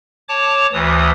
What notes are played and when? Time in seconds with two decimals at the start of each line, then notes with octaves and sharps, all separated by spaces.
0.29 C#5 A5 D6
0.73 D2 E3 D#6